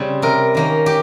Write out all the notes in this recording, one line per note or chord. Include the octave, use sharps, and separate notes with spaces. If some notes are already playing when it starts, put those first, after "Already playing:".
Already playing: C#3 G3 C4
C3 A#4
D#3 A#3 C#4
G4